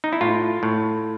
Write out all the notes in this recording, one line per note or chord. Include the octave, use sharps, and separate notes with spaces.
D#4
E4
A2 F4
A2